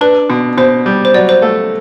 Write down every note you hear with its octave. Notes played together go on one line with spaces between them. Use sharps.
D4 B4
B2
B2 C5
G3
C5
F#3 D5
C5
A3